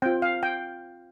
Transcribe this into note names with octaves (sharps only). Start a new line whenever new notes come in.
C4 F4 G5
F5
G5